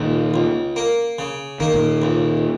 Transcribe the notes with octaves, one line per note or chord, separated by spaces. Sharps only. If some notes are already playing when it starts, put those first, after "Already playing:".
Already playing: C#2 A#2 D#3
C#2
A#3
C#3
D#3 A#3
A#2 D#3
C#2